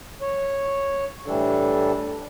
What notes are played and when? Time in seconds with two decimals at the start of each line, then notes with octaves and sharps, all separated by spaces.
0.22 C#5
1.26 A2 E3 G3 D4 A4